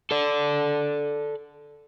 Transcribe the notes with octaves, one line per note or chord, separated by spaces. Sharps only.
A4 D5